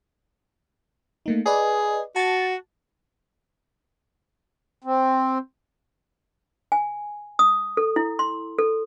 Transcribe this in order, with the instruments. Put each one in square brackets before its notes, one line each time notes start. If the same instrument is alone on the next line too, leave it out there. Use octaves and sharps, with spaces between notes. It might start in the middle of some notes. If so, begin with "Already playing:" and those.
[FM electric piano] A3 A#3 D#4
[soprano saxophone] G#4 [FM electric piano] B4 D5 D#5
[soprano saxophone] F#4 [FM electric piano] A5 A6
[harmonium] C4
[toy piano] G#5
D#6
A4
E4
C6
A4